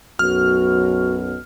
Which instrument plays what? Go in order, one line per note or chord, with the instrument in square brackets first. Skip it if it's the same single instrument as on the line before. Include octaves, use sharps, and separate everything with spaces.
[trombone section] B1 F#2 B2 [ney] F#4 [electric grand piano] F6